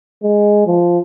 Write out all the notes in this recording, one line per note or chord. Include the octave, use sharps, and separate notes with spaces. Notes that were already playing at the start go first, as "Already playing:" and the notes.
G#3
F3